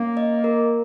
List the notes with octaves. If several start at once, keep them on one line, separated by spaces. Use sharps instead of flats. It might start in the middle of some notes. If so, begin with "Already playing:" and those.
Already playing: A#3 C#4
D#5
A#4